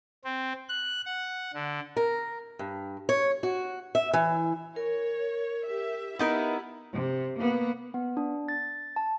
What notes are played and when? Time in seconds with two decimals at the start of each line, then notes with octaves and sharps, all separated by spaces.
0.24 C4
0.69 F#6
1.05 F#5
1.54 D3
1.97 A#4
2.59 G2
3.09 C#5
3.43 F#4
3.95 E5
4.13 E3
4.76 A#4 C#5
5.66 G4 E5
6.19 B3 D#4 E4 G4 A#4
6.93 C3
7.39 A#3 B3
7.94 B3
8.17 D4
8.48 A6
8.96 A5